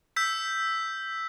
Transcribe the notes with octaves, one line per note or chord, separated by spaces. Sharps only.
E6 G6 B6